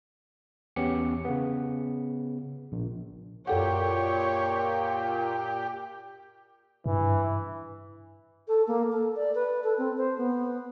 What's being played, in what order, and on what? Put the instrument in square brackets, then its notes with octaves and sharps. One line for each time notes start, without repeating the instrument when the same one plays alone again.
[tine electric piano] E2 B3 C#4 G4 C#7
C#3 B3
A#1
[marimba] F#2 A4 F#5 [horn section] A#2 [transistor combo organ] G4 [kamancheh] C#5
[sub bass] G2 [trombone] E3
[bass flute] A4
A#3
A4
D5
B4
A4
C4
C5
B3